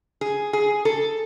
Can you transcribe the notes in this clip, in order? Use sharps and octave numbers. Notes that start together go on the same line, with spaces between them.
G#4
G#4
A4